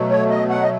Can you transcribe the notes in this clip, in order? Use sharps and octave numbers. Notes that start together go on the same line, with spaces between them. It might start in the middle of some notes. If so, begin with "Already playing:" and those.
Already playing: B2 F#3 A3
C#5
D#5
F#5
D#5